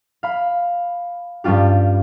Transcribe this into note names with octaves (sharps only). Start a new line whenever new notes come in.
F5 B5
G2 G3 C#4 F4 G4